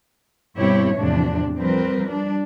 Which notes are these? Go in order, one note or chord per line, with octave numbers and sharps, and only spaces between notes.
G2 B2 C4 E4 G4 C#5
E2 A2 C3 F3 D4
F3 G3 C4 A#4 B4
G3 D4